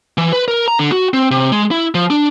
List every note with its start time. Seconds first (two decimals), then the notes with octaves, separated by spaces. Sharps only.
0.18 E3
0.33 B4
0.48 A#4
0.68 A#5
0.79 D3
0.92 F#4
1.14 C4
1.31 C3
1.52 G#3
1.71 E4
1.95 F3
2.10 D4